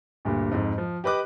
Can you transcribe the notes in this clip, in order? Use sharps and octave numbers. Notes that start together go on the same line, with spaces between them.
D2 G2 A#2
F2 G#2
F3
G4 B4 D#5 D6 F#6